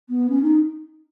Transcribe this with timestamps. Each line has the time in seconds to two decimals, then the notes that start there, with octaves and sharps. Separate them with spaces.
0.09 B3
0.29 C#4
0.42 D#4